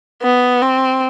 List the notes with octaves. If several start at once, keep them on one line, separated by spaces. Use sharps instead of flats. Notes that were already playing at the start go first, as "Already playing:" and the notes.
B3
C4